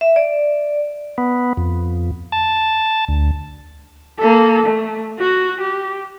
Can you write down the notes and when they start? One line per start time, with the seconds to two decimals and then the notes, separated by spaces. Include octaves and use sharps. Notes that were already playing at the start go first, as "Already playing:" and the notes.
0.01 E5
0.16 D5
1.18 B3
1.57 F2
2.32 A5
3.08 D2
4.19 A#3 A4
4.66 A3
5.19 F#4
5.61 G4